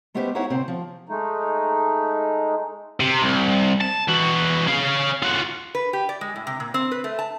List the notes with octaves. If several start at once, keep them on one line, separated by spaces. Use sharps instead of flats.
G#3 A3 B3 C#4 G4 C5
D#4 E4 F#4 G#4 C#5 F#5
D2 A2 C3 C4 C5
F3
G#3 A3 D#4
C3
C2
A5
E3 F#4
C#4 F5
F4 F#4
B4
G4
D5
G#3
A2
C3
A#2
C4
B4
A3
A5